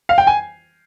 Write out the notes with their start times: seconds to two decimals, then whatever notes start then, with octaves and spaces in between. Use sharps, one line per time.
0.09 F5
0.18 G5
0.27 G#5